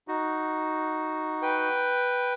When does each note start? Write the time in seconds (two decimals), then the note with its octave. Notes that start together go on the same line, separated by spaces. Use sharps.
0.08 D#4 F#4
1.42 B4 G5